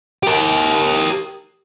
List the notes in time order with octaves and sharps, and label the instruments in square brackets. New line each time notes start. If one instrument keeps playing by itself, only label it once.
[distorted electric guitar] G4 A#4